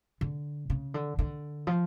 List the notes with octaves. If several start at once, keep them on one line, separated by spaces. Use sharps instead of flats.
D3
C#3
D3
D3
F3